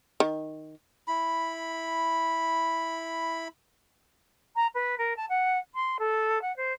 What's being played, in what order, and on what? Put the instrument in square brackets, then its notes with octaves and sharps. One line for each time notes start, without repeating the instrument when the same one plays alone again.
[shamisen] D#3
[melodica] E4 B5
[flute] A#5
B4
A#4
A5
F#5
C6
A4
F#5
C5